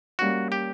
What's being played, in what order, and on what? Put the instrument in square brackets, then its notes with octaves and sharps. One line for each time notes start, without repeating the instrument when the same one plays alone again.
[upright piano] G3 A#3 C#4 [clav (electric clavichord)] F#4
[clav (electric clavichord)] G4